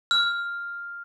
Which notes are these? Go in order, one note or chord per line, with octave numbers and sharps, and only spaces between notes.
F6